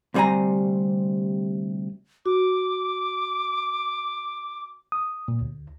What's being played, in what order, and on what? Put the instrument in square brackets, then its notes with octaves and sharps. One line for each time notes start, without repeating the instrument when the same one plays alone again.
[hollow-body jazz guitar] D2 C3 G3 C4 G#5 A#5
[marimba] F#4 [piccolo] D6
[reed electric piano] D#6
A#2
D2